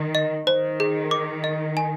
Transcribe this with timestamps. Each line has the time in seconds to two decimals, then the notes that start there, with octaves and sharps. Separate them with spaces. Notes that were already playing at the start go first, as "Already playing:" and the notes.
Already playing: D#3
0.15 D#5
0.47 D#3 C5
0.80 G#4
1.11 D6
1.44 D#5
1.77 G#5